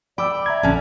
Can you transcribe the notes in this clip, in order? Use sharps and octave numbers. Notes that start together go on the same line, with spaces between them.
D5 G5 B5 D6 E6
E5 A#5 G#6
A#1 D3 C#4